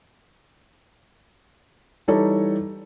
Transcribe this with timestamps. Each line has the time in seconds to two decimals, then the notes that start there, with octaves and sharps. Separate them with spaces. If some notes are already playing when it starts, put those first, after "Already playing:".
2.08 E3 G3 D#4 A4 C#5